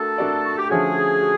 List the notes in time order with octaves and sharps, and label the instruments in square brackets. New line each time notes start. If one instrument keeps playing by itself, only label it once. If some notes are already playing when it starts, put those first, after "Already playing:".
Already playing: [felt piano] A3 D4 F#4 A#4 [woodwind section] A4
[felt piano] A3 D4 F#4 A#4 D5
[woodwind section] F#4
G4
[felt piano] D3 F3 A3 C#4 F#4 [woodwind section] G#4
[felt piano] F#4